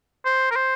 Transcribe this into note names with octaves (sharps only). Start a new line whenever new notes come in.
C5
A#4
C5